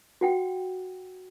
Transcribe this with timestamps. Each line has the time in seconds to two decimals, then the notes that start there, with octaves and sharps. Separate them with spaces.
0.21 F#4 F#5 G5